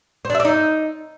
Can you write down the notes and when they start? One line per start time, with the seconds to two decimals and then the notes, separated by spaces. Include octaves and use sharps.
0.25 C5
0.30 D4
0.35 E5
0.40 D5
0.45 D#4